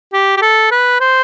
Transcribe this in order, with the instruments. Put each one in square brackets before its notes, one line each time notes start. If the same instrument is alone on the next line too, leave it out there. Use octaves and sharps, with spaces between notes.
[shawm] G4
G4
A4
B4
C5